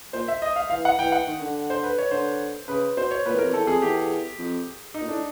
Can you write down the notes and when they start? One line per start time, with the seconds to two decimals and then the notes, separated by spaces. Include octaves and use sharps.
0.13 A#2 C5
0.28 E5
0.42 D#5
0.56 F5
0.70 E3 F5
0.85 F#5
0.98 E3 G5
1.12 F#5
1.27 D#3
1.41 D3
1.70 C5
1.84 B4
1.98 C#5
2.11 D3 C5
2.68 C#3 B4
2.97 B2 C5
3.11 C#5
3.26 A#2 B4
3.35 E2
3.39 F2 A#4
3.53 E2 A4
3.67 F2 G#4
3.82 E2 G4
4.38 F2
4.94 D#4
5.01 A#2
5.08 A2 D4